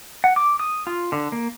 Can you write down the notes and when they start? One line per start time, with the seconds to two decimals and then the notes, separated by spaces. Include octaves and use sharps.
0.24 F#5
0.36 D6
0.59 D#6
0.87 F4
1.12 D3
1.32 A#3